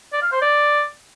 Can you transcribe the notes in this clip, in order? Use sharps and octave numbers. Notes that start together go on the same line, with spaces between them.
D5
F5
C5
D5